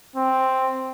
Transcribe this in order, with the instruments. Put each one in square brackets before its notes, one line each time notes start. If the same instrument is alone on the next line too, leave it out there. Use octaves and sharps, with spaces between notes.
[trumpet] C4